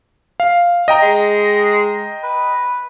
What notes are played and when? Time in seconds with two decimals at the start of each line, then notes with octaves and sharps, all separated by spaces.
0.40 F5
0.88 D#5 G5 A#5
1.02 G#3
2.23 B4